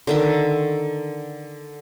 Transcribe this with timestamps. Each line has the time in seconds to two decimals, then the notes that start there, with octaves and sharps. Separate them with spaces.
0.07 D3 D#3 E5